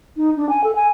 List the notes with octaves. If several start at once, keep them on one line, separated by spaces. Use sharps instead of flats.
D#4
D4
G#5
A4
G#5